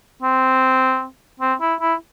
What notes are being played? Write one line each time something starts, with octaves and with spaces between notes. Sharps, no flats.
C4
C4
E4
E4